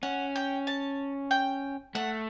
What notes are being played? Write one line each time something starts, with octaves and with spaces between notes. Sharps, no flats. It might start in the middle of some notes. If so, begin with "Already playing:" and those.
C#4 F#5
G5
A5
G5
A3 F#5